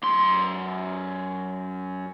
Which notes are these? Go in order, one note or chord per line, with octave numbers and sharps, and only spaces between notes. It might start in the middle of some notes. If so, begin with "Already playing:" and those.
F#2 C6